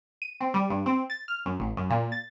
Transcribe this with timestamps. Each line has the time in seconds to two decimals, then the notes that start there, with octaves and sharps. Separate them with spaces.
0.22 D#7
0.41 C4
0.54 G3
0.70 G2
0.86 C4
1.10 A6
1.28 F6
1.46 F#2
1.59 A1
1.77 F#2
1.90 A#2
2.12 A6